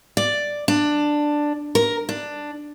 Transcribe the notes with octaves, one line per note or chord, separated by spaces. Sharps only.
D5
D4
A#4
D4